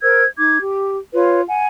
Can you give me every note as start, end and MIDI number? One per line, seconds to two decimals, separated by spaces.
0.01 0.24 70
0.01 0.24 72
0.01 0.24 88
0.01 0.24 92
0.38 0.58 63
0.38 0.58 86
0.38 0.58 92
0.60 0.97 67
1.13 1.40 65
1.13 1.40 71
1.13 1.40 73
1.48 1.66 78
1.48 1.66 80